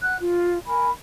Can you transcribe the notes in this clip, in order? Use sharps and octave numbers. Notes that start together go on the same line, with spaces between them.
F#5 F#6
F4
A#4 G#5 B5